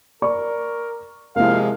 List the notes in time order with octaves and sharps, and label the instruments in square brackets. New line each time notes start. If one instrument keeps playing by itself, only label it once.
[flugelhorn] A#4 [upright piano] D5 C#6
[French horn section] C3 F3 G#3 [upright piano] A#3 E4 [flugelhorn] F5